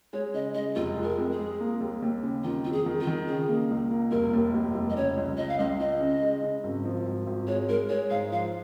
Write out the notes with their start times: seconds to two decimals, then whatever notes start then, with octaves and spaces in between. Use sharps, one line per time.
0.13 G#3 C#5
0.34 C#3 D#5
0.54 G#3 D#5
0.76 F1 F4
0.97 G#3
1.04 A#4
1.18 F2
1.32 G#4
1.39 G#3
1.60 A#3
1.81 D#2
2.02 D#2
2.23 C#3
2.44 D#3 F4
2.65 F2 F4
2.72 G#4
2.86 D#3
3.00 F4
3.07 D#3
3.28 C#3 G#4
3.49 A#3
3.70 C#2
3.91 A#3
4.11 F1 A#4
4.33 D#2
4.54 F1
4.75 F1
4.90 D#5
4.96 C#3 C#5
5.17 C#2
5.37 C#3 D#5
5.49 F5
5.59 C#2 D#5
5.80 C#3 D#5
6.01 C#3
6.22 G#3
6.43 C#3
6.64 G#1
6.85 F3
7.06 G#1
7.27 G#1
7.47 G#3 C#5
7.69 G#3 A#4
7.89 G#3 C#5
8.10 G#2 F5
8.32 F3 F5